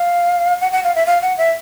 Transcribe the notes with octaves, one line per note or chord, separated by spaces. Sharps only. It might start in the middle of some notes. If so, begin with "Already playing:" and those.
Already playing: F5
F#5
F#5
F5
E5
F5
F#5
E5